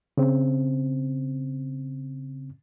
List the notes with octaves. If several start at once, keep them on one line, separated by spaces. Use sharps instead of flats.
C#3 C4